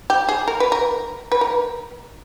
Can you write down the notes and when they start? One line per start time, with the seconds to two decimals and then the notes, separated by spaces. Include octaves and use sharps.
0.10 G4
0.29 G#4
0.48 A#4
0.60 B4
0.72 A#4
1.32 B4
1.41 A#4